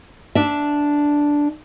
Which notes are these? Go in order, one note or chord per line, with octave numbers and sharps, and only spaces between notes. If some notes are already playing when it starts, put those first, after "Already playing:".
D4 E5